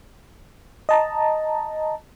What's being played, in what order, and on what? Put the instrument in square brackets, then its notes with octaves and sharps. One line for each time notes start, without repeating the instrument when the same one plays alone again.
[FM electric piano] D#5 A5 A#5